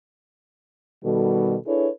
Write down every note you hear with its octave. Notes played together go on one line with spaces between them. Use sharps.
B2 D#3 G3 F#4 A4
D4 E4 G#4 A4 B4 C#5